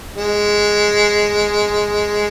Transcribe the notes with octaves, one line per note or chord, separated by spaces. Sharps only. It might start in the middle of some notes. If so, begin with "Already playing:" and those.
G#3